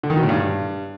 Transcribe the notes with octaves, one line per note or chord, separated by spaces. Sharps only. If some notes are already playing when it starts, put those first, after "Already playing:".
D3
D#3
B2
A2
G2